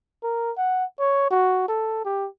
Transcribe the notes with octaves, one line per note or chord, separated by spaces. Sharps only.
A#4
F#5
C#5
F#4
A4
G4